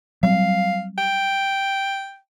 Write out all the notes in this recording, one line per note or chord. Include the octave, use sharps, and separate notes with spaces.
F#3 G3 C4 F5
G5